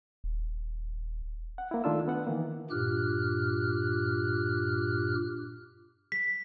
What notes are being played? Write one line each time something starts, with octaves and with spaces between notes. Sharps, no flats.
D#1
F#5
A#3 E4
D#3 A3 D4 F4 E6
B3 F#5
D#3 E3 A#3
G2 A#2 G4 F6 F#6
B6